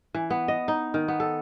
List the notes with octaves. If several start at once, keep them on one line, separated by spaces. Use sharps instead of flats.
E3
B3
D#5
D#4
D#3
B3
A4